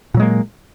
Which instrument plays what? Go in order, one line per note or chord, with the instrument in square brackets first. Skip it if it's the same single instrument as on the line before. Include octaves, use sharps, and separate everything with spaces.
[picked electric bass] A#2
F#3
G#3
A#3